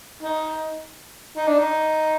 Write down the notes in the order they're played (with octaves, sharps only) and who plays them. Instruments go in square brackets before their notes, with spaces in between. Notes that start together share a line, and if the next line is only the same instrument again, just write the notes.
[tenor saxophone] D#4
D#4
D4
D#4